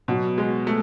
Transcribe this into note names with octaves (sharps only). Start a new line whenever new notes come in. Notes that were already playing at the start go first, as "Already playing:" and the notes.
B2 F#3 B3 F#4
G#3
A3